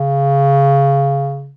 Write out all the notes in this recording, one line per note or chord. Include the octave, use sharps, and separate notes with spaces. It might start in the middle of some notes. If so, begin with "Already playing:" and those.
Already playing: C#3